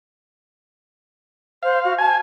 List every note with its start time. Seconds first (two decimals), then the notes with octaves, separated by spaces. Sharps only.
1.63 C5 F5
1.84 F#4
1.98 G#5 A5